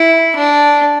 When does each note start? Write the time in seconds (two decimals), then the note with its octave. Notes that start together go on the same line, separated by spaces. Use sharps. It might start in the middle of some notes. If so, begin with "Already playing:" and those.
Already playing: E4
0.35 D4